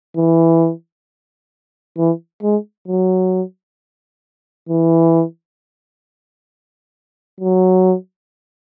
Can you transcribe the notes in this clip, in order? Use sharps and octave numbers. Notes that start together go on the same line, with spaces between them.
E3
E3
G#3
F#3
E3
F#3